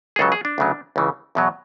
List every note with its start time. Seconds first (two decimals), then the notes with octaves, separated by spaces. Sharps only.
0.16 G#4
0.19 C#2 C#3 F#3 A4
0.32 G#4
0.45 D4
0.58 D2 C#3 F#3
0.96 C#2 C#3 E3
1.35 E2 B2 F#3